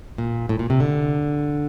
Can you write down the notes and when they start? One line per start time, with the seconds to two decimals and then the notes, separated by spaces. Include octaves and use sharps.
0.18 A#2
0.49 A2
0.59 A#2
0.70 C3
0.80 D3